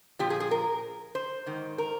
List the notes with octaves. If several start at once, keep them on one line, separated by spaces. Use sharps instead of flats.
A#2 F3 G4
G#4
G#4
A#4
C5
G#2 D#3
A#4